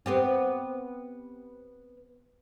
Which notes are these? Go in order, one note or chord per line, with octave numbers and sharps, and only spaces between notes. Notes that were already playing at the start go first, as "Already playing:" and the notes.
B3 C4 G4